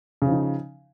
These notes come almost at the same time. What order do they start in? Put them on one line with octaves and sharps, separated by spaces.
C#3 F3 D#4